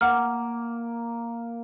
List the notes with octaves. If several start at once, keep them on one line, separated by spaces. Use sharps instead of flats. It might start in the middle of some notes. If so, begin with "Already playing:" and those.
A#3 F#5 F6